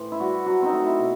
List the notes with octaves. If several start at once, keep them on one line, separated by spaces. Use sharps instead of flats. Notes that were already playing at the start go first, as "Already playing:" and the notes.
Already playing: A2 E3 C5
E4
G3 F#4
F#3 F#4
C4 D#4
A3
E4
B2